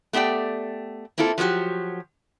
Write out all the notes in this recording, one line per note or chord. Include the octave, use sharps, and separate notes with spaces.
A3 B3 G4 D5 G5
A#3 C4 E4 F4 A4
F3 F#3 G#3 F#4 G4